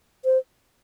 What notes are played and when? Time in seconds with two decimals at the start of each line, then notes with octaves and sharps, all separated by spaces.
0.25 C5